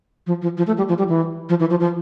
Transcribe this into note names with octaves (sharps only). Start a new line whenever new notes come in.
F3
F3
F3
A3
G3
F3
G3
E3
F3
E3
F3
F3